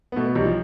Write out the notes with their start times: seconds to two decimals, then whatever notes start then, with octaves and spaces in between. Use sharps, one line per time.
0.12 B3
0.16 B2 A3
0.26 B3
0.35 B1 G3
0.45 F3